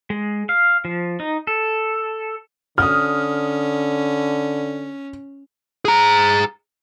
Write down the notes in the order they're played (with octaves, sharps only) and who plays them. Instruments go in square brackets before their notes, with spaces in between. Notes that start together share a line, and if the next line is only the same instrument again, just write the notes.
[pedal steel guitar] G#3
F5
F3
D#4
A4
[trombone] D3 [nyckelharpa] C#4 [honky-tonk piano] D#6 F6
[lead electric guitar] G#4 A#5